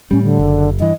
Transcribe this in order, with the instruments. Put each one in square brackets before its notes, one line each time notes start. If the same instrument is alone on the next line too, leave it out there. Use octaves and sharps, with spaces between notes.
[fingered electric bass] A2 G3 [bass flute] C#4
[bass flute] D3
[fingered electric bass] F#1
[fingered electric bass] G2 E3 [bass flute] D#5